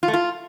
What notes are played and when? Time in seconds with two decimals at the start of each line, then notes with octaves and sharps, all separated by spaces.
0.03 F4
0.08 A3
0.14 F4